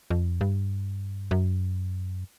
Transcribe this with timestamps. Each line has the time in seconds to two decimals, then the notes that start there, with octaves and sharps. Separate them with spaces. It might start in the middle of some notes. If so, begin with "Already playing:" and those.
0.10 F2
0.41 G2
1.31 F#2